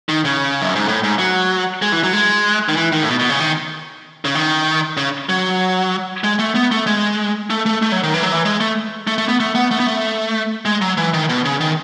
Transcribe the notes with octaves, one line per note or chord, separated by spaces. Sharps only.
D#3
C#3
F#2
G#2
A2
G#2
F#3
G#3
E3
F#3
G#3
D#3
E3
D#3
A2
B2
B2
C#3
D#3
C#3
D#3
C#3
F#3
G#3
A3
B3
A3
G#3
A3
A3
A3
F#3
D#3
E3
F#3
E3
G#3
A3
A3
A3
B3
A3
B3
A3
B3
A3
G#3
F#3
E3
D#3
B2
C#3
D#3